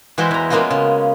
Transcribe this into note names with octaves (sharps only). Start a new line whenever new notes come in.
E3 G#3 E4 F#4 G4 C5
E2 A#5
G#3 A#3 B3 C#4 F4 F#4
C#3